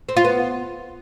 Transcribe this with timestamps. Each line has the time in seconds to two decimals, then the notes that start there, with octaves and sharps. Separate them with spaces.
0.09 C4
0.17 F4
0.25 B3